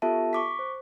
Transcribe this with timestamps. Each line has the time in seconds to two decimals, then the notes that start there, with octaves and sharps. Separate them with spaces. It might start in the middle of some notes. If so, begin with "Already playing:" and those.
0.02 B3 F4 G4 A4 E5 A5
0.33 C#6 D6 B6
0.59 C5